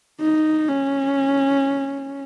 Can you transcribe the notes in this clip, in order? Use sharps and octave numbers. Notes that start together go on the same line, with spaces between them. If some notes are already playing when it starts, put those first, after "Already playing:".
D#4
C#4